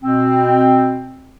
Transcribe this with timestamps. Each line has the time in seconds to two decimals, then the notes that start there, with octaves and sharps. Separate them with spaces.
0.03 B2 C4